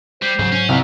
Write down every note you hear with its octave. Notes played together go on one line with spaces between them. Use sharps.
G3 C5
G#2 C#3 F#3
C#4
C2 G4 F5